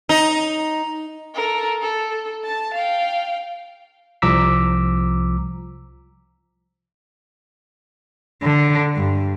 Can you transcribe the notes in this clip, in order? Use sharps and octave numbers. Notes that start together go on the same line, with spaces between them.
D#4
A4 A#4
A4
A5 A6
F5 G5
C2 F3 A#5 D6 E6 B6
D3
G2